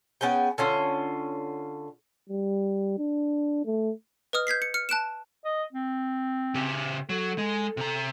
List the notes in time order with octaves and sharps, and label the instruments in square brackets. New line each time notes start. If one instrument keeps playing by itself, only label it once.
[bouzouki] B3 C#4 G#4 G5
D3 C#4 F4
[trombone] G3
D4
A3
[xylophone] B4 D#5 D#6 F6
G6 G#6 B6 C7
C#7
F6 C#7
A5 F#6 D7 E7
[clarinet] D#5
C4
[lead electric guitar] C#3 G4
[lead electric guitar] F#3 [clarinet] A4
[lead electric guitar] G#3
C3 A#5